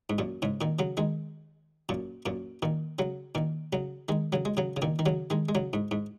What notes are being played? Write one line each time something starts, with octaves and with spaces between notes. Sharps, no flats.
G#2
F#2 A#2
G#2 C#3
A#2 D#3
C#3 F#3
D#3 G#3
F#2 A#2
F#2 A#2
A#2 D#3
C#3 F#3
A#2 D#3
C#3 F#3
D#3 G#3
C#3 F#3
G#3
C#3 F#3
C#3
A#2 D#3
D#3
C#3 F#3
D#3 G#3
G#3
C#3 F#3
G#2
G#2